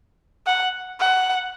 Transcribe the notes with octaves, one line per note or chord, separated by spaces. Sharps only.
F#5
F#5